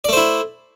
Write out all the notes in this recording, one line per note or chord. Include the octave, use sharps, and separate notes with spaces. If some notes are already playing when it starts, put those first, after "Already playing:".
A3 E4 C5 D5